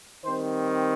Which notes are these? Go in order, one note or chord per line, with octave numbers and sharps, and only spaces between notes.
D#3 G3 C4 C5